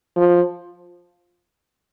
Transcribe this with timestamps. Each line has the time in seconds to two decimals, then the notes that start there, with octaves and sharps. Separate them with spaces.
0.16 F3